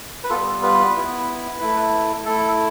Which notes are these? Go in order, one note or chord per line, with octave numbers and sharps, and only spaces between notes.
B4
G3 B3 F4 A4
B4
B3 E4
A3 E4
A3 E4 A4